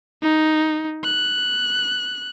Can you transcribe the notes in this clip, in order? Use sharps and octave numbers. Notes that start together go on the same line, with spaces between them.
D#4
F#6